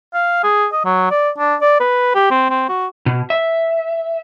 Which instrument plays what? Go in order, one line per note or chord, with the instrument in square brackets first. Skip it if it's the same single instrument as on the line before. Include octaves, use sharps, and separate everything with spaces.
[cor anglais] F5
G#4
D#5
F#3
D5
D4
D5
B4
G4
C4
C4
F#4
[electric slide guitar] B2
E5